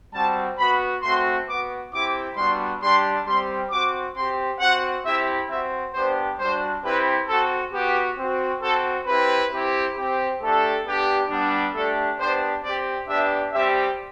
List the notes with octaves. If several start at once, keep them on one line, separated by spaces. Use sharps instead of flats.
G3 C4 F#4 A5
B3 F#4 B5
A3 C4 F#4 C6
B3 F#4 D6
C4 E4 G4 D6
G3 B3 D4 F#4 C6
G3 D4 G4 C6
G3 C4 G4 C6
C4 F#4 D6
C4 G4 C6
C4 F#4 F#5
C4 E4 G4 E5
C4 F#4 E5
B3 D4 G4 C5
G3 D4 F#4 C5
C4 E4 G4 B4
C4 F#4 A4
B3 F#4 G4
C4 F#4
C4 F#4 A4
C4 E4 G4 B4
C4 E4 G4
C4 G4
A3 D4 G4 A4
B3 D4 G4
G3 B3 D4
A3 D4 G4 A4
B3 D4 G4 C5
C4 G4 D5
B3 D4 G4 E5
G3 C4 G4 E5